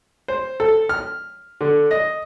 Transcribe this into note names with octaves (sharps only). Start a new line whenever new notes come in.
C5
A4
F6
D3
D#5